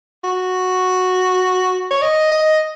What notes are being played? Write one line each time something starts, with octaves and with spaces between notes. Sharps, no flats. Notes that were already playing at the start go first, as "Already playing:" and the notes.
F#4
C#5
D#5
D#5